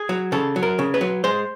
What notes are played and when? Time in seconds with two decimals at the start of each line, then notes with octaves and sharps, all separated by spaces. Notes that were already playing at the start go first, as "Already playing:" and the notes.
Already playing: G#4
0.09 F#3
0.32 C#3 A4
0.56 F#3
0.63 A#4
0.79 C#3
0.94 B4
1.01 F#3
1.24 G#3 C5